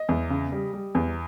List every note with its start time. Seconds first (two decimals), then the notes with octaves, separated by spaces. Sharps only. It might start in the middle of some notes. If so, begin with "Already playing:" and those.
Already playing: D#5
0.09 E2
0.30 C#3
0.52 G3
0.73 G3
0.95 E2